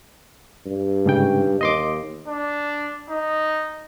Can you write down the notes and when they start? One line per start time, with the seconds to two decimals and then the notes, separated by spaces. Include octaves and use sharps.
0.66 G2
1.06 G#2 C#3 G5
1.61 D#2 D#5 C6 D6
2.28 D4
3.09 D#4